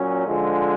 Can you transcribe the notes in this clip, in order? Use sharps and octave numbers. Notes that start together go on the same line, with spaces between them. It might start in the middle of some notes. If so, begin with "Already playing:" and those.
Already playing: A#2 F#3 C#4
D3 F3 G#3